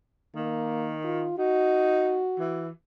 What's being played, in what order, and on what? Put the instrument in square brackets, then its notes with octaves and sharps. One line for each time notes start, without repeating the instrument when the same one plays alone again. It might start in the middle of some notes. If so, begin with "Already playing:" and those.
[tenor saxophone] D#3 [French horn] A#3
[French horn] F4
[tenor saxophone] D#4 [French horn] F#4
[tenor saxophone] E3